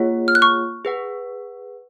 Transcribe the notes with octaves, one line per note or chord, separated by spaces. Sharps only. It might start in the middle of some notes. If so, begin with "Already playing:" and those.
Already playing: A#3 F4 G#4 C#5 F#5
F6
F#6
C#6 F6
G#4 B4 F#5